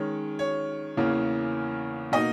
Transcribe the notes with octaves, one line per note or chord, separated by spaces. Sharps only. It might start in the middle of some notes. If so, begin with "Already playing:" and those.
Already playing: D#3 G#3 C#4 C#5
C#5
E2 C#3 E3 A#3 C#4
B2 A#3 D#4 D#5